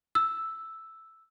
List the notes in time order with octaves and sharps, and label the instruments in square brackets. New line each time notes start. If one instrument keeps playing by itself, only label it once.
[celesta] E6